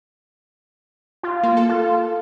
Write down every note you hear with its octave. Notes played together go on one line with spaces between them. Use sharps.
F4
A#3
A4
F4